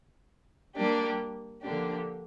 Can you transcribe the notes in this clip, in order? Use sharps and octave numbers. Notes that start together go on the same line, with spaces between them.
G3 A#3 D4 G4
D3 F3 A#3 D4 G4